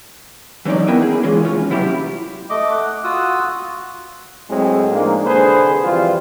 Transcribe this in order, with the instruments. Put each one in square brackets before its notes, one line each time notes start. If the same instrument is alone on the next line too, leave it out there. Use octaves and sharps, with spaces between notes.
[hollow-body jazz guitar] E3 F#3 C#4 D#4 D5
B3 E4 A#4 G5 G#5
G#4
E3 G#3 C#4 F4
C#4 F4
F#3 E4 F4 G4
[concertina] A3 D#5 D6
F#5
F4 F#4 F#5 D#6 E6
[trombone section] A2 F#3 G#3 C4
F3 G#3 A#3 D4 D#4
C2 D3 G#4 B4 C5
F2 E3 G3 F4